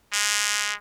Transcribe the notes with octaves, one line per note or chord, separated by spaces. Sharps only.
G#3